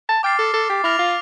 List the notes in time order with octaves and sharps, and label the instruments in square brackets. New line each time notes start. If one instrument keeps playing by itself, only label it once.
[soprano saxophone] A5
[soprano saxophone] G5 [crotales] D6 F6 A6 C7
[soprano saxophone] A4
A4
G4
[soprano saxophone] E4 [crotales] F6 A#6 F7
[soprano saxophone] F4